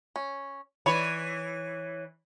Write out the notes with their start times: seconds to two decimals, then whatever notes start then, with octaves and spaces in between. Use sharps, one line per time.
0.16 C#4
0.86 E3 B4 C#5 D5